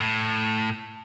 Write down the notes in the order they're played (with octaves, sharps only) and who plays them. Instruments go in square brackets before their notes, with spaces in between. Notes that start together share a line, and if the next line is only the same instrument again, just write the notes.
[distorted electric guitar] A2